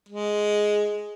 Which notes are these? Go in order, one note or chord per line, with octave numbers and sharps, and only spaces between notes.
G#3